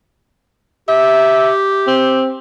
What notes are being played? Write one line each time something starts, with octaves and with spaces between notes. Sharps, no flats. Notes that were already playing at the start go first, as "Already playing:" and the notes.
G4 E5
C4